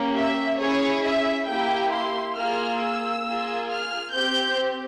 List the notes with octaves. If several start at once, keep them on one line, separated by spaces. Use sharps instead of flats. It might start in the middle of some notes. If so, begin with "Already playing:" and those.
Already playing: A#3 C#4 G4
E5
C#4 E4 G#4 C#5
E5
A#3 E4 G4 G5
C6
A#3 F4 G#4 F6
E6
A#3 F4 G#4
F6
C4 G4 G6